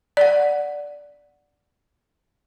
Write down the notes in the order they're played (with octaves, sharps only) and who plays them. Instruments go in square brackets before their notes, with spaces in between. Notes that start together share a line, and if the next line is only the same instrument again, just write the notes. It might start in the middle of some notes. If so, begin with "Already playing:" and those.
[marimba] D5 F#5